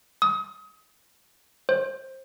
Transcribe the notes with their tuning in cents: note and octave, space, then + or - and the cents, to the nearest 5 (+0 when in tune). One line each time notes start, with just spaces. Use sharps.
D#6 +30
C5 +25